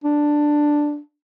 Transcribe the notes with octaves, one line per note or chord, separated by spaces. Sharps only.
D4